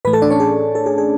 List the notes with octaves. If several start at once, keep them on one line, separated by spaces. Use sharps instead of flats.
A2 E3 A3 B4 B5
A4 A5
D4 D5
C#4 C#5
G#4
A4
G#4
G#4